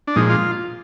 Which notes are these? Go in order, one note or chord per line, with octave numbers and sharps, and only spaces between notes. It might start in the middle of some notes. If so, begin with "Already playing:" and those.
D4
A#2 F3 G#3 D#4
F4